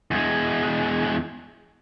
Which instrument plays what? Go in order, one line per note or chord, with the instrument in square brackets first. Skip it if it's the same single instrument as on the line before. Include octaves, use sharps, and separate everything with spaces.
[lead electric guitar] E2 G#3